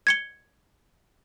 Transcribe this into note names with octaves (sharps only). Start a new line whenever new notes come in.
G#6 C#7 G7